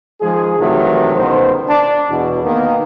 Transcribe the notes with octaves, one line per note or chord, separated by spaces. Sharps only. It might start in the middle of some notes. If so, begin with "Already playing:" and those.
D#3 F3 G#3 G#4
G2 C3 D#3 E3 F#3 A3
C#2 B2 D#3 F#4 C5
D4
E2 B2
D#3 A#3 B3